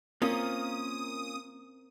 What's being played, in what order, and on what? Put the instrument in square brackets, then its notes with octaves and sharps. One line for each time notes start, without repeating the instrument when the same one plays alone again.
[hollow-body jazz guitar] A#3 C#4 F4 [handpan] C4 A#4 [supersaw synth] D#6